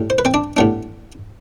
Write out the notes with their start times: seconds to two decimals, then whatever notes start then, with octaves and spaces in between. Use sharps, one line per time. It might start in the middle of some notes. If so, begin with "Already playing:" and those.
Already playing: A2 G3
0.10 C5
0.18 B4
0.25 C4 C5
0.34 D4 D5
0.57 A2 G3 B3 D4